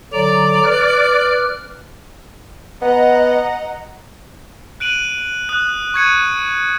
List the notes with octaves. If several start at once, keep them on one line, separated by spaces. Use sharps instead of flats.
D3 F#3 D5 A#5
B4 F6
B3 D#5 F#5 A#5
F#6 D7 D#7 F#7
D#6 F#6
C#6 G#6 C#7 D#7